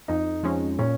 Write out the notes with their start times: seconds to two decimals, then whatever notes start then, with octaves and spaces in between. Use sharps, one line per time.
0.08 F2 D#4
0.43 F3 G#3 C#4
0.79 A#2 C#4